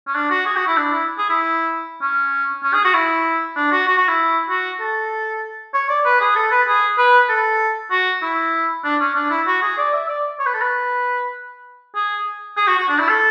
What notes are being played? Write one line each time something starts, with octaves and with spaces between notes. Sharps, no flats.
C#4
D4
F#4
G#4
F#4
E4
D4
E4
G#4
E4
C#4
C#4
G#4
F#4
E4
D4
F#4
F#4
F#4
E4
F#4
A4
C#5
D5
B4
G#4
A4
B4
G#4
B4
A4
F#4
E4
D4
C#4
D4
E4
F#4
G#4
D5
E5
D5
C#5
B4
A4
B4
G#4
G#4
F#4
F#4
D4
E4
A4